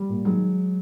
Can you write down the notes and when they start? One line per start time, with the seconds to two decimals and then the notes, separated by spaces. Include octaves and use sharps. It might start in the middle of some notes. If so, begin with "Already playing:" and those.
Already playing: G3
0.09 A#2
0.25 D#3 F#3 G#3